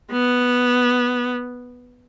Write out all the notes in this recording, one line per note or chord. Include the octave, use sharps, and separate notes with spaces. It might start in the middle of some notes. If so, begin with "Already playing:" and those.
B3